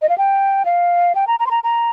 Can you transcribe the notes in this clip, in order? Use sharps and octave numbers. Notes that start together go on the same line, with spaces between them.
D#5
F5
G5
F5
G5
A#5
A#5
C6
A#5
A#5